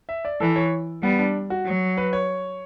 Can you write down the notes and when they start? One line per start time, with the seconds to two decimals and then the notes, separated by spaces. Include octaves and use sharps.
0.09 E5
0.25 D5
0.41 E3 A4
0.56 C#5
1.02 G3 B3
1.19 D4
1.50 F#4
1.66 F#3
1.97 B4
2.13 C#5